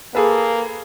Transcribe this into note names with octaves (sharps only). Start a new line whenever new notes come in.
A#3 G#4 A4 B4